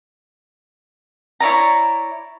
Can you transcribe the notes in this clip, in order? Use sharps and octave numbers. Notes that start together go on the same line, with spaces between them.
E4 C#5 D5 A#5